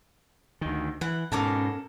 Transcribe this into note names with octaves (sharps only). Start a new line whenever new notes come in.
D2 D#3
E3 F#5
G#2 B2 C#4 A4 A#4 D6